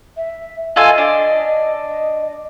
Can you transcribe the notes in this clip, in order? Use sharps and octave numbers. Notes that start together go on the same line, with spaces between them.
E5
F4 A4 D#5 G#5
D4
D#5